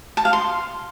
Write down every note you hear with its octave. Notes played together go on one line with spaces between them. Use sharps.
A5
F5
C6